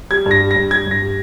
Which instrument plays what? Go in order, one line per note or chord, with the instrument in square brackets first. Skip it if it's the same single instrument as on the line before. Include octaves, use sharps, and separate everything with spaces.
[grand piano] G3 G#6
G2
A#6
G3
A#6
G2
G3 G#6
G2 A#6
G3